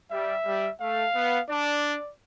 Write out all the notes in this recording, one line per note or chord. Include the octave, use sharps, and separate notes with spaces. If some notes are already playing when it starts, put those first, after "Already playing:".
G3 E5
G3
A3 F5
B3
D4 D5